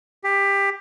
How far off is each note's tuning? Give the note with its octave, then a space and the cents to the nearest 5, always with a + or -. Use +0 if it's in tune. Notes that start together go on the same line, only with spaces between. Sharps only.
G4 +20